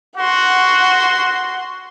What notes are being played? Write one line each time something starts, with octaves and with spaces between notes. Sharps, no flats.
F#4 F#5 C6